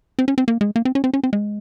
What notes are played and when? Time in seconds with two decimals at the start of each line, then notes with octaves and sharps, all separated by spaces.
0.19 C4
0.28 C#4
0.38 C4
0.48 A#3
0.61 G#3
0.76 A#3
0.85 C4
0.95 C#4
1.04 C4
1.13 C#4
1.23 C4
1.33 G#3